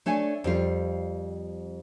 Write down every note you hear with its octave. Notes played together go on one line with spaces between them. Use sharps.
A3 D4 C#5 G#5
F2 G3 F4